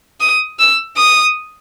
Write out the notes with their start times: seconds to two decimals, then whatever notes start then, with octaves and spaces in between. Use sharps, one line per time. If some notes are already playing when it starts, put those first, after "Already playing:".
0.21 D#6
0.59 E6
0.97 D#6